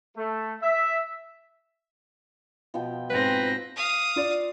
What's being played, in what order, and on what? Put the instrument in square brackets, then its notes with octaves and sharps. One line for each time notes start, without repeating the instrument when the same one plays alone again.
[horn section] A3
E5
[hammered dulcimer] B2 F3 G5
[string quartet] G#2 C4 A#6 [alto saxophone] B4
[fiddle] F5 D#6
[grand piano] F4 D5